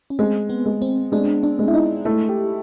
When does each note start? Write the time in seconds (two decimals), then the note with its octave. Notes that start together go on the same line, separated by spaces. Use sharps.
0.10 C#4
0.19 G#3 C4
0.50 B3
0.66 G#3
0.82 C4
1.12 G#3 D4
1.43 D4
1.59 G#3
1.68 E4
1.74 D#4
2.05 A3 E4
2.29 G4